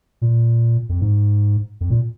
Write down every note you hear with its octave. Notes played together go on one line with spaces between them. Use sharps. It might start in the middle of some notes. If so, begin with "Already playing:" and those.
A#2
F2
G#2
F2
A#2